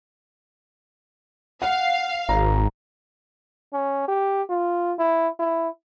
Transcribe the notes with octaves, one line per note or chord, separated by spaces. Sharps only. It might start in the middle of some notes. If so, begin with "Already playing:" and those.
F5 F#5
G#1 A#5
C#4
G4
F4
E4
E4